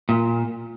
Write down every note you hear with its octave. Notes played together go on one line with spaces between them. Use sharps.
A#2